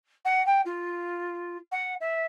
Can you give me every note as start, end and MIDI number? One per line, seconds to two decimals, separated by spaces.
0.25 0.44 78
0.46 0.61 79
0.65 1.57 65
1.71 1.94 78
2.00 2.25 76